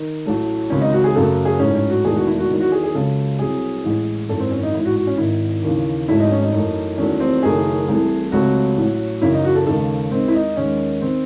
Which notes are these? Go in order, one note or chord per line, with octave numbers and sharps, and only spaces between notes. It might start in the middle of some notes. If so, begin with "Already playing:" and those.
Already playing: D#3
A1 A2 F#3 A3
C#2 C3 D#3 F#3 C#4
D#4
F#4
G#4
F#2 C#3 F#3 A3 A4
G#4
A1 G#2 F#3 A3 C#4
C#4
F#4
E1 E2 D#3 A3 G#4
F#4
E4
F#4
E2 D#3 F#3
F#4
G#4
G#4
C#2 C#3 F#3 A4
C2 C3 F#3 G#4
A1 A2 E3 G#3
G#1 F#2 E3 A4
C4
C#4
D#4
A1 G#2 E3 E4
F#4
F#4
C#4
G#1 G#2 D#3 E4
D#2 C#3 E3
G#1 G#2 F#3 A3 E4
D#4
C#4
D#4
F#2 E3 A3
E2 D#3 F#3 A3 C#4
C4
F#1 F#2 D#3 A3 G#4
C2 C3 E3 A3
C#2 C3 F#3 A3 F#4
A1 A2 F#3
F#2 C#3 E3 E4
D#4
F#4
A4
D#2 C#3 G#3 A4
D#2 D#3 G#3 C4
E4
D#4
D#2 D#3 G#3 C#4
D#3 C4